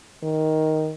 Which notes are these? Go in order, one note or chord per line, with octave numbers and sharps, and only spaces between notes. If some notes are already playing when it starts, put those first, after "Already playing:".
D#3